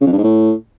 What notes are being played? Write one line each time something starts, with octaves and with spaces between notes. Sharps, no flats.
C#3
F2
G2
G#2
A2